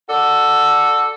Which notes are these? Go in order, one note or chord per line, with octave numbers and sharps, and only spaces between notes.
F#4 A4 D5